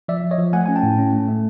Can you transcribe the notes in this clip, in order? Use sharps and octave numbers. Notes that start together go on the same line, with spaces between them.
F3 D5 E5
F3
C#5 D#5
F3
A3 F#5 G#5
C#4 G#5
G5 A5
A2
C#4
A3
A3